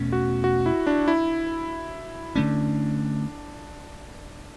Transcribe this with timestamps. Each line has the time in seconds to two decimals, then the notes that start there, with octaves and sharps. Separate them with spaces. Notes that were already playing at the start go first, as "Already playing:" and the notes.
Already playing: E2 B2 A3 C#4
0.12 F#4
0.44 F#4
0.66 E4
0.87 D4
1.08 E4
2.35 D3 A3 C#4 D4